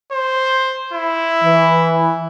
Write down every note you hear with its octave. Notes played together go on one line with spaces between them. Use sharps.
C5
E4
E3